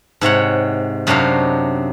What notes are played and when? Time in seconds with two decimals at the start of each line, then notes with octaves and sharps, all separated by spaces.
0.21 G#2 C3 C#5 F#5
1.07 F#2 C3 F#3 D4 D#4 F5